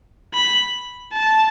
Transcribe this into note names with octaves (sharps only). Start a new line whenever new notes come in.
B5
A5